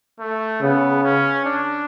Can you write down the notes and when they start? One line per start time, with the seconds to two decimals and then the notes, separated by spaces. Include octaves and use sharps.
0.20 A3
0.61 C#3 B3
1.04 C#4
1.45 D4